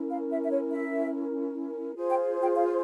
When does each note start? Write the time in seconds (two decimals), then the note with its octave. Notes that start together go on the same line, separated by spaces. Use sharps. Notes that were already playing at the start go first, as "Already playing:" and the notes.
Already playing: C#4 E4 A#4
0.09 F5
0.31 E5
0.43 E5
0.50 C#5
0.71 E5
1.94 F4 G#4 C5
2.09 G5
2.41 G5
2.55 F5